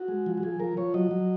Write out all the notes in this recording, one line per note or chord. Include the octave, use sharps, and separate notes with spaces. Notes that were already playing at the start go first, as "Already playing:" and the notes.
Already playing: F#4
G#3
F3
F#4
F3 G#4
F3 A#4
F3 C#5
F#3 D#5
F#3